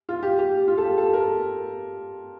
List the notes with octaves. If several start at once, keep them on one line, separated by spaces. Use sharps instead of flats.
F4
G4
G4
F4
A4
G4
A4
A#4